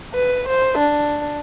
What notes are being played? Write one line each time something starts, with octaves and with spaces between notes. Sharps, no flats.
B4
C5
D4